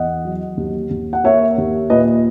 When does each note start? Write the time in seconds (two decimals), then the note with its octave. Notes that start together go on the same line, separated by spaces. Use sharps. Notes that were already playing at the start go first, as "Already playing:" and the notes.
Already playing: E2 D#5 F#5
0.25 F#3
0.57 D#2
0.90 D#2
1.13 F#5
1.24 A#3 C#5 E5
1.58 D#2
1.90 A#2 B4 D#5